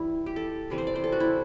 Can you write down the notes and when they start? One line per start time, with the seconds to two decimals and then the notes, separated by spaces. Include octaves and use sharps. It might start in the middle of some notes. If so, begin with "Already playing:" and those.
Already playing: E3 G3 E4
0.26 G4
0.36 A4
0.70 C3 E3 G3 C4
0.78 C5
0.87 D5
0.96 C5
1.04 A4
1.12 F#4
1.20 E4